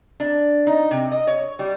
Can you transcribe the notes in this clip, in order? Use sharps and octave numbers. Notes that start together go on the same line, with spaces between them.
D4
D#4
C3
D#5
C#5
G3